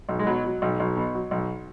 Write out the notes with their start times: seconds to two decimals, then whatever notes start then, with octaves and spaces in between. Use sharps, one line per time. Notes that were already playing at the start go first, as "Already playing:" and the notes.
0.09 B1
0.19 G#3
0.27 B2 F#3
0.45 F#3
0.62 B1
0.80 B1
0.97 B2
1.14 F#3
1.31 B1